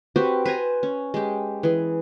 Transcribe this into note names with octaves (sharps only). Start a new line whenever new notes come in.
C4 F#4 G4 B4
B4 C5 G#5 A#5
C#4
G#3 G4
E3 G#4